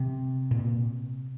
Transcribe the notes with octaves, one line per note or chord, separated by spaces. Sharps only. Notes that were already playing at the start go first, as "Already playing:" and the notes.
Already playing: C3 C4
A#2